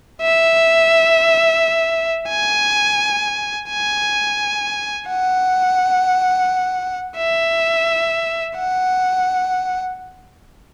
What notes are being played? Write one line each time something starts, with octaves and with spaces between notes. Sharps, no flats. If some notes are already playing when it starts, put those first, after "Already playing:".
E5
G#5
G#5
F#5
E5
F#5